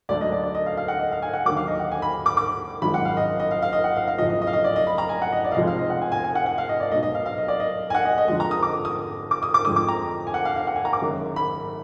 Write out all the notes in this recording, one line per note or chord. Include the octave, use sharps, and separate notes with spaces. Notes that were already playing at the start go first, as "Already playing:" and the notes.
D2 D3 F#3 D5
D#5
D5
D5
D#5
F5
F5
F#5
D#5
F5
G#5
F#5
D#2 D3 F#3 D6
F5
D#5
F#5
G#5
B5
D6
D6
G#1 F#2 F3 G#3 B5
F#5
F5
D#5
D#5
F5
F5
D#5
F#5
F5
F5
F#1 F2 F3 D#5
D#5
D#5
F5
D#5
D5
D#5
B5
A#5
G#5
F#5
D#5
D5
F5
F1 F2 F3 G#3 D#5
F5
D#5
F#5
G#5
G#5
G#5
F#5
F#5
F5
D#5
D5
B1 B2 F#3 D#5
D#5
F5
F5
D#5
D5
D#5
G#5
F#5
D#5
D#5
F2 D3 F3 G#3 D#5
A#5
D#6
D6
D#6
D6
D#6
D6
F2 D3 G#3 D#6
D6
A#5
G#5
F#5
F5
F5
F#5
G#5
A#5
D6
F#1 F#2 D#3 F#3
B5